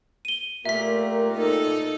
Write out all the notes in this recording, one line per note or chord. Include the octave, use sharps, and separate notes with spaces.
D#7 G7
A#2 A3 A#3 G4 E5 B6
D#4 A4